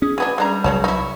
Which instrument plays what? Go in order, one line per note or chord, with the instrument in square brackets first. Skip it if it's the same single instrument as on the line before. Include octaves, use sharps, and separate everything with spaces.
[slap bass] C#4 [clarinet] G#4
[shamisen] F#3 B3 D4 [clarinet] G#5
[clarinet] G3 [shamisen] G#3 D4 A#5
[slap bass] C2 F3 F#3 [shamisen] C#3 C#5 A5
[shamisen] D#4 E4 [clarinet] C#6